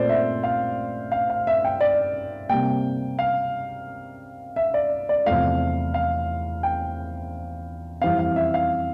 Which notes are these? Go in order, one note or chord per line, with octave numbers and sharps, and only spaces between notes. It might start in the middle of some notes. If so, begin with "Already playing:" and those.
Already playing: A#2 A3 C4 C5 D5
E5
F5
F5
F5
E5
G5
D5
C3 G3 A#3 G5
F5
E5
D5
D5
E2 C3 F3 A3 F5
F5
G5
F2 E3 G3 C4 F5
F5
E5
F5